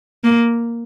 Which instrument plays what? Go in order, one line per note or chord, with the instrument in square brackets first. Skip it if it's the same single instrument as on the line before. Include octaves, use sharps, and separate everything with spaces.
[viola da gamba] A#3